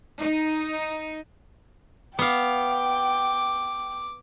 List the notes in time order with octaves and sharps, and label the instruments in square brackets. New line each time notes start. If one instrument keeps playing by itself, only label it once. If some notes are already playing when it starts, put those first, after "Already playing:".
[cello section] D#4
[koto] B3 F5 [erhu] G5 [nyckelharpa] D6